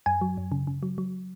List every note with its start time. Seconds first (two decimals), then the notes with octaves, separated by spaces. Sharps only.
0.06 F#2 G#5
0.21 F#3
0.37 F#2
0.52 C#3
0.67 C#3
0.83 F#3
0.98 F#3